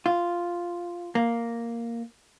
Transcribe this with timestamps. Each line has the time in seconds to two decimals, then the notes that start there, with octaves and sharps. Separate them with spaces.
0.06 F4
1.15 A#3